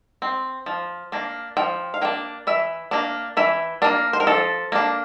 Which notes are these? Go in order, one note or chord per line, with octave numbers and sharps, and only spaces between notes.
C4
F3
A#3 D4
F3 G5
F5
A#3 D4 G5
E3 E5
A#3 D4
E3 E5
A#3 D4 A#4
C5
A#4
F3 A4
A#3 D4